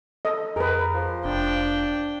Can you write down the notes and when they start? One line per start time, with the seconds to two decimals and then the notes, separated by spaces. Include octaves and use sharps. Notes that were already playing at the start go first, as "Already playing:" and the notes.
0.25 A4 D#5
0.56 F2 G#4 A#4 B4
0.94 F3
1.24 F1 D4 G5